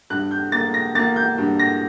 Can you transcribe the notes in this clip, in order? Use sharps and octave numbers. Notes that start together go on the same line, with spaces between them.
G2 F#6
G6
A#3 A6
A#6
A#3 A6
G6
G2
A#6